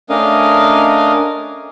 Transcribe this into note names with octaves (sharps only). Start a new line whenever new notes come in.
A3 C#4 D4 A#4 D#5 F5